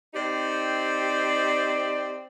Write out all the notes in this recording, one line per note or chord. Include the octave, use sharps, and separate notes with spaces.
C4 D#4 G4 D5